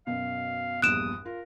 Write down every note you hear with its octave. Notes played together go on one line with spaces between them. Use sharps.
F#2 B2 F5
A#1 E2 G2 D#6 F#6 D7 E7
F4 A#4